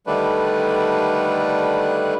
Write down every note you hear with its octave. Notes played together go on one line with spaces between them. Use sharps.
D3 D#3 G3 A3 D4 B4